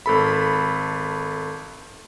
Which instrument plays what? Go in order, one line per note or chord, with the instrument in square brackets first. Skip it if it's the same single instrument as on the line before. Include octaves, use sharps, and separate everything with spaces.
[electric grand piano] G#1 A4 B5